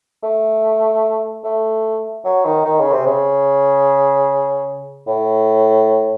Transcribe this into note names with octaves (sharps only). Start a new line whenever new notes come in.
A3
A3
F#3
D#3
D#3
C#3
C3
C#3
A2